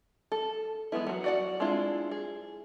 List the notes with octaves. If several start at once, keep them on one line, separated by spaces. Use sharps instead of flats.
A4
E3 G#3 B3 E4
F#3 F#4
F#4 D5 F#5
G#3 C4 D4 E4 F4
G#4